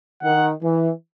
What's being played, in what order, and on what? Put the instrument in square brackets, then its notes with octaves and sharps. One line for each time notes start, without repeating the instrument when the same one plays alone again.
[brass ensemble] D#3 [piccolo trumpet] F#5
[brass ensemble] E3